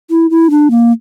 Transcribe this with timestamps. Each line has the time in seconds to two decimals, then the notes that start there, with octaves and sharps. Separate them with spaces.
0.10 E4
0.30 E4
0.50 D4
0.71 A#3